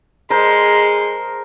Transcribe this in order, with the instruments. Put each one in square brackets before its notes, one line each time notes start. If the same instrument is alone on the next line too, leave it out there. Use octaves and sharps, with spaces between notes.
[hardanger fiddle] G#3 C6 [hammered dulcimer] A#4 C5 A5